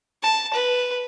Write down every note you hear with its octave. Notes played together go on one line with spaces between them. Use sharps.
A5
B4